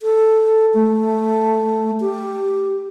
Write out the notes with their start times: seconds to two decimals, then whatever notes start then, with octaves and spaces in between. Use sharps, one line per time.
0.02 A4
0.74 A3
2.01 G4